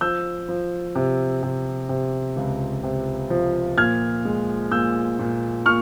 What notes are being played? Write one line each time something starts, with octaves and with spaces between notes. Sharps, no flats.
F3 E6 G6
F3
C3
C3
C3
C#2
C3
F3
A#2 F6 G#6
G#3
A#2 E6 G6
A#2
A#2 C#6 F6